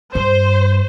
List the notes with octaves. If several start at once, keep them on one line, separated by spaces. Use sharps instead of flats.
G2 C5